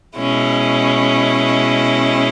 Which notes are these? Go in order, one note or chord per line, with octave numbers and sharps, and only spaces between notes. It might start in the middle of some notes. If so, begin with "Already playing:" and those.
B2 G#3 C#4 E4